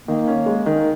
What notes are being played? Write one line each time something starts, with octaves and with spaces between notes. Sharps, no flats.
D#3 A#3
C#4
G#3
D#3